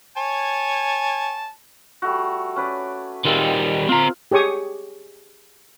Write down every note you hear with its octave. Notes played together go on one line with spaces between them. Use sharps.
C#5 G#5 A5
G3 A3 F#4
C#4 B4 D5
D#3 G3 G#3 A#3 C4
C4 F4 A#5
G4 G#4 C#5 C#6 D#6